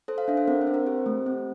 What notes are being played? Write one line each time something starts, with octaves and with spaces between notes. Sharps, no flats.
A4 C5
F5
D4 E5
C5
C4 A#4
C5
C4
A#4
G4 C5
A3
C4